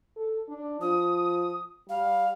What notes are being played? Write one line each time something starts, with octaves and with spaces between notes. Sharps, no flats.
A4
D4
F3 D#6
G3 F5